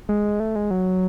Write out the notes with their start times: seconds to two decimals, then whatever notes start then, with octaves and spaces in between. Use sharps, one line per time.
0.09 G#3
0.40 A3
0.55 G#3
0.71 F#3